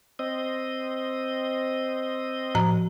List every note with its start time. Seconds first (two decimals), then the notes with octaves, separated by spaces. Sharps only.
0.19 C4 D#5
2.55 A2 F3 A#5